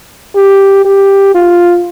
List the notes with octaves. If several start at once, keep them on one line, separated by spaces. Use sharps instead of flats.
G4
G4
F4